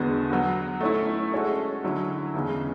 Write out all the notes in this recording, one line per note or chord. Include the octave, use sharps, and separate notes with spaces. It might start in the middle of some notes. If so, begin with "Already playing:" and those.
Already playing: E2 D3 G#3 B3 F#4
F#3 B3 F#4
A3 C#4 E4
G#3 C#4 F#4 A4
D3 F#3 C#4 E4
E2 C#3 E3 G#3